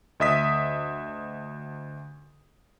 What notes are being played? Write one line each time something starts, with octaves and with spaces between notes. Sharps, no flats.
D2 D#5 E5 D#6 B6